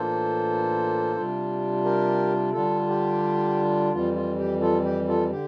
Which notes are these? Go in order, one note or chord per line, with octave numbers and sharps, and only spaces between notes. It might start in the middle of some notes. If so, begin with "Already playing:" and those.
Already playing: A2 E3 A#3 D4 F4 A4 C5
C3 G3 D4 F4
G4 A#4
D3 G3 D4 F4 A4
G4
F2 E3 G3 F4
F4
G4
F4 A4
G4
F4 A4
D3 G4